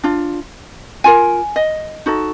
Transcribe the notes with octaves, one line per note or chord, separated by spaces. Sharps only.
D4 F4
F4 A#4 G#5
D#5
D#4 F#4 A4